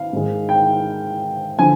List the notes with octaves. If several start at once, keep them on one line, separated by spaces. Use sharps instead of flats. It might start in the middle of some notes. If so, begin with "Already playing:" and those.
Already playing: F5
G#2 D#3 G#3
G5
D3 F3 G#5